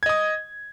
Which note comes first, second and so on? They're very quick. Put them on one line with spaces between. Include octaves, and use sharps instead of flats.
G#6 D#5 D#6